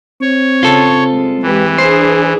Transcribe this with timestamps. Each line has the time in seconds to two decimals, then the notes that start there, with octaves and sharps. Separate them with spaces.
0.21 C4 C#5
0.63 C#3 F4 A4
1.12 G3 G#3
1.43 E3 G#3 G4 B4
1.78 D4 G#4 B4 C5